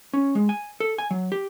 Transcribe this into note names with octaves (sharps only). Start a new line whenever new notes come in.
C#4
G#3
G#5
A4
G#5
F#3
G4